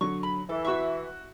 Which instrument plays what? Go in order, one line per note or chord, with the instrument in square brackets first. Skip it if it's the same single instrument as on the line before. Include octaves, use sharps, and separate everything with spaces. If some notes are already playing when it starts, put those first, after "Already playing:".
[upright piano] D3 F#3 [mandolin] C#6
[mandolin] B5
[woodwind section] E3 [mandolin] A4
[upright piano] E4 F#4 [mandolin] E5 C#6 E6